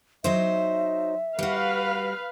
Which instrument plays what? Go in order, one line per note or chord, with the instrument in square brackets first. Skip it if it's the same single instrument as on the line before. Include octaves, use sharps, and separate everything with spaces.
[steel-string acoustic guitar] F#3 D#4 C5 [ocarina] E5
[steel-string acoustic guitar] G3 F#4 [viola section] B4 F5